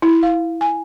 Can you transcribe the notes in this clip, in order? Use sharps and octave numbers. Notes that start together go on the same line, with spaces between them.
E4
F5
G#5